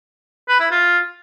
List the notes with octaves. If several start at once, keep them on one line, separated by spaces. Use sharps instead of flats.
B4
E4
F4